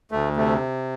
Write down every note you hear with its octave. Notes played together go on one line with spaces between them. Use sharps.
D2 A3
C3 A3